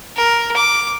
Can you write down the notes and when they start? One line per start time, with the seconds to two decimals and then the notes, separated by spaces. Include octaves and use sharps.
0.17 A#4
0.56 D6